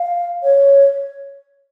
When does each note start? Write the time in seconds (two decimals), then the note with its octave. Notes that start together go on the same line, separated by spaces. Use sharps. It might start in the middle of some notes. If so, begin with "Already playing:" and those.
Already playing: F5
0.43 C#5